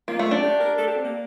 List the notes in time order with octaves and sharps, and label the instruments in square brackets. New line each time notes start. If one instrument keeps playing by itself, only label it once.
[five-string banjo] A#3 [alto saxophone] F4
[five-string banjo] A3
D4
[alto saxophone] G4
A#4
A4
G4
C4
A#3